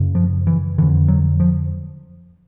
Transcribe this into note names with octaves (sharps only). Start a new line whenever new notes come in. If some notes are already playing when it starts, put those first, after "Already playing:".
Already playing: F#2 C#3
F3
E3
F2 D3 E3
F#3
F3